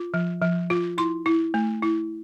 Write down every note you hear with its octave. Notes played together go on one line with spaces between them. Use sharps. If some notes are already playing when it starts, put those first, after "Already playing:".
Already playing: F4
F3
F3
F4
E4 C6
E4
A3
E4